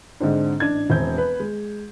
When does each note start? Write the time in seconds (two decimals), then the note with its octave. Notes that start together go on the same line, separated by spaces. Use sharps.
0.20 G#2 D3 C4 D4
0.60 A1 D4 G#6
0.90 E1 C4 G6
1.17 B3 B4
1.40 G#3